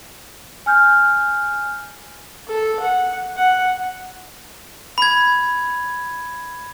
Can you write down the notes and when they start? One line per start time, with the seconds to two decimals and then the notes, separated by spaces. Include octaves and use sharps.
0.66 G#5 F6 G6
2.48 A4
2.81 F#5
3.36 F#5
4.98 B5 G#6